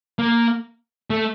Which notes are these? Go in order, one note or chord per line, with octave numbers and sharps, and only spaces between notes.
A#3
A3